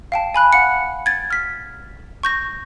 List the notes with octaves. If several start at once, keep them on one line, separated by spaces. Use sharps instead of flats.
F5 G5 A5
G#5 B5 F#6
F5 F#5 C#7
G#6 A6
F6 B6
C#6 G6 A#6